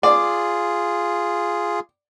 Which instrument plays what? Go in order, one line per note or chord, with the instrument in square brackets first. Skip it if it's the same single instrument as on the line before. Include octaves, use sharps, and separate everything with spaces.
[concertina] F4 G#4 [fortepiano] D5